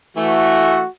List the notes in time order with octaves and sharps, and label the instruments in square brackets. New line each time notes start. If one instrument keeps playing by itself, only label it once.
[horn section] E3 A3 [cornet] F#4